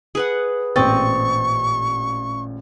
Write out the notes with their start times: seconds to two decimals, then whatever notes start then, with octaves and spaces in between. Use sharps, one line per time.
0.15 G#4 B4 F#5
0.76 A1 A#2 C4 D#5 C#6 A6